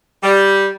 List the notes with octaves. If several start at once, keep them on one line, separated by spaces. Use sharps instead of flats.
G3